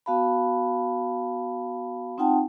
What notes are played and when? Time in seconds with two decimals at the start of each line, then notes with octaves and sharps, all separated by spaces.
0.06 B3 F#4 F5 A5 B5
2.18 C4 D#4 F4 F#5 G5 A5